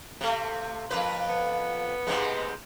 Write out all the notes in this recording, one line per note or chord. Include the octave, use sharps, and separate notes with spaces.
C3 A3
F2 A#3 B4
B3
G#2 C3 G#3